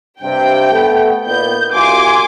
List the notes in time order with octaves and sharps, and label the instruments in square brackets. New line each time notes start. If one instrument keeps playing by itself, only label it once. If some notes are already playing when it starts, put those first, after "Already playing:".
[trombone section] G2 C3 [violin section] G5
[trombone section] A3 B3
[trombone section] A#2 D#3 B3 [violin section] G6
[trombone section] C2 F4 F#4 [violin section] G#5 C6 D6